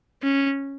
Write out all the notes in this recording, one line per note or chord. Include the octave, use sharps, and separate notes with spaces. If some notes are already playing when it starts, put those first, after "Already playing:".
C#4